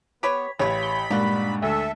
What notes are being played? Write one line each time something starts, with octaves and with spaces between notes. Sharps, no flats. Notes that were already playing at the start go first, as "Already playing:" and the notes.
B3 G4 B4 C#5 B6
A1 C#3 G4 C#5 B5
G7
G2 A#2 G#3 D4 D#4 F#4
D2 A4 E5